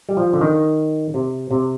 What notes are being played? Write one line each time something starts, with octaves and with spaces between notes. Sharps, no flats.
G3
F3
D3
D#3
C3
C3